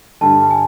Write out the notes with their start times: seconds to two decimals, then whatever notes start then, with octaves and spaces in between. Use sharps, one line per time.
0.21 G2 D3 G3 A5
0.51 G#5